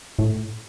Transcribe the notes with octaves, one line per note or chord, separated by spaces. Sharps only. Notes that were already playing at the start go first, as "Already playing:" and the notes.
A2